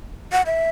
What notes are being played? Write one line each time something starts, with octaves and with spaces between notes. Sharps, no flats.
F#5
E5